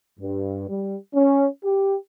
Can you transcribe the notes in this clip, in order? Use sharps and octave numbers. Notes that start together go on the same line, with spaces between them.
G2
G3
C#4
G4